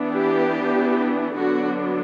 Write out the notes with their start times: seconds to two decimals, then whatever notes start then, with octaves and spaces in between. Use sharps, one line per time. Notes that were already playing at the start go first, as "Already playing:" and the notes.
Already playing: E3 B3 D4
0.13 G4
1.37 D3 F#3 B3 D4 F#4